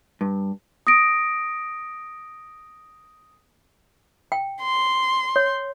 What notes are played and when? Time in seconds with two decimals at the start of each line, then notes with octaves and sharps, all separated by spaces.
0.21 G2
0.87 D#6 A#6 D7
4.32 G5
4.62 C6
5.36 C#5